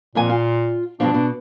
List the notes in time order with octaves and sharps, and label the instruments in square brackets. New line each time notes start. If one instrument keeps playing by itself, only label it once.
[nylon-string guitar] F2 A#3 G#5 [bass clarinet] A#2
[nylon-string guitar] F4
[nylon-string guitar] G2 B2 F3 [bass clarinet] D4
[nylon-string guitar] B2